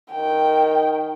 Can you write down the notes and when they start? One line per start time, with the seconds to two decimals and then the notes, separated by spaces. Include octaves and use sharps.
0.12 D#3 G5